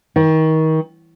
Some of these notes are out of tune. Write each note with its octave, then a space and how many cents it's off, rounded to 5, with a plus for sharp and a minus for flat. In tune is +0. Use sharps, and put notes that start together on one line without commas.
D#3 +30